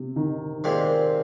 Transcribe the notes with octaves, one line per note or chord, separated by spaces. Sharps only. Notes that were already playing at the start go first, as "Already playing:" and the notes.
Already playing: C3
D#3
A#2 G#3 C4